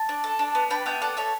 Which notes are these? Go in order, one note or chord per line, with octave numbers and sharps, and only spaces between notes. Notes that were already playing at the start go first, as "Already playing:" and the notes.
Already playing: A5
D4
A4
D4
B3
D4 G5 B5
B3 E5 G5
A4 D5 F#5
A4 C#5 E5